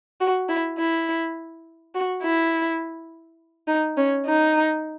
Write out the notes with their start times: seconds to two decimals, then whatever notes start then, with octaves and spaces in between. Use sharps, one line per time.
0.20 F#4
0.49 E4
0.78 E4
1.95 F#4
2.23 E4
3.68 D#4
3.97 C#4
4.26 D#4